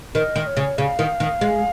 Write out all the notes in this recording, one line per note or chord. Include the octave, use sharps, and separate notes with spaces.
D#3 D#5
D#3
C#5
C#3
C#3 F5
D#3
D#3
G#3